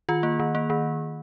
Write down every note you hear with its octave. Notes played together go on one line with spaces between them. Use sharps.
D#3 F4
A#3
D#3
A#3
D#3